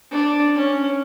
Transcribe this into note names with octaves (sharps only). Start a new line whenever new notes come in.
D4
C#4